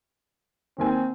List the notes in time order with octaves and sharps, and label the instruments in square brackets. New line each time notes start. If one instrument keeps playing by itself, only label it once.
[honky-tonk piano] D#3 A#3 G#5 [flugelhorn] C4